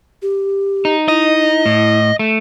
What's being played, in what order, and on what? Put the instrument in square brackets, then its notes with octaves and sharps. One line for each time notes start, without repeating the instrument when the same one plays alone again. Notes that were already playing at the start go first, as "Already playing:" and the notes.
[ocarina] G4
[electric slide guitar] D#4
[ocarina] E4 [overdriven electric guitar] D#5
[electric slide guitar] A2
A3